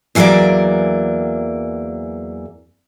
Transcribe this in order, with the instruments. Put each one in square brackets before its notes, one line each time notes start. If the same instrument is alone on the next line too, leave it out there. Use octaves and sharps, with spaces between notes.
[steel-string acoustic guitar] E2 E3 F#3 A#3 A#4 D5